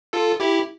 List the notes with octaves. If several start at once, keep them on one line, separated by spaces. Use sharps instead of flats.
F4 A4
E4 G4